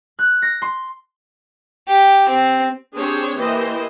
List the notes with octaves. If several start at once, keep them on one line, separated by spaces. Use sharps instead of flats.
F#6
A#6
C6
G4
C4
C4 D4 G4 G#4 C5 C#5
E3 A#3 E4 G4 C5 D#5